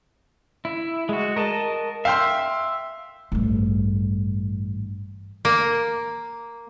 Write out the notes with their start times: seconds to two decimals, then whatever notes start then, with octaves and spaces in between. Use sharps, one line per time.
0.65 E4
1.09 G#3 F#4
1.37 A#4 D#5 A5
2.05 E5 F5 G5 C6
3.32 A1 G2
5.45 A#3